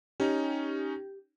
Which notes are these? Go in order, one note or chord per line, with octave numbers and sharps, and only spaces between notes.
C#4 D#4 G4